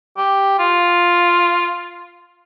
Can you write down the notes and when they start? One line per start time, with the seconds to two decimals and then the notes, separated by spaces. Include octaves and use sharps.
0.18 G4
0.59 F4